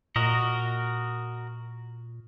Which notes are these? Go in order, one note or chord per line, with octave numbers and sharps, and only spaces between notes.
A#2 F#4 A#4 D#5